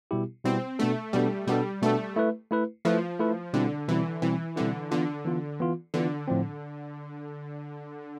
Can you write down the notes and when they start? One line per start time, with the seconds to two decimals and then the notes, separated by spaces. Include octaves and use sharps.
0.11 B2 G3 B3 E4 G4
0.45 B2 G3 B3 C4 E4 G4
0.79 B2 A3 B3 D4 A4
1.13 B2 G3 B3 D4 A4
1.47 B2 G3 B3 D4 A4
1.82 B2 A3 B3 D4 A4
2.16 A3 E4 B4
2.51 A3 E4 B4
2.85 F3 A3 E4 B4
3.20 A3 E4 B4
3.54 B2 D3 G3 C4 E4
3.88 B2 E3 G3 C4 E4
4.22 B2 E3 G3 C4 E4
4.56 B2 D3 G3 C4 E4
4.91 D3 E3 B3 F4
5.25 E3 B3 F4
5.60 E3 B3 F4
5.94 D3 E3 B3 F4
6.28 A2 F3 C4